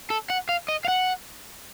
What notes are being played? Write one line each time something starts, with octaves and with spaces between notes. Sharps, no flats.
A4
F#5
F5
D#5
F5
F#5